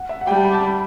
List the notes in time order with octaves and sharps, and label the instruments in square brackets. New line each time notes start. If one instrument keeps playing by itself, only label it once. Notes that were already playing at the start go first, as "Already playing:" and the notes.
Already playing: [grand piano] F#5
E5
F#5
[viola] G3 [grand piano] G5
[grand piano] A5
B5
A5
B5